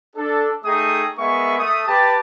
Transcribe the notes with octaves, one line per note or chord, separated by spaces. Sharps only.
D4 A4
A3 D#4 G#4 G5 D#6
G#3 B3 A#4 E5 G#5 C#6
A3 D#6
G4 B4 A5